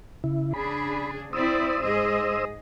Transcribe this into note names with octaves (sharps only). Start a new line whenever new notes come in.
C#3 E4
C#3 D4 G#4 B5
C4 E4 C5 D5 D#6 E6
G#2 G#4 D#5